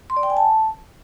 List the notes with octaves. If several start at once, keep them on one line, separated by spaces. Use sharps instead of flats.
C6
D5
G5
G#5
A5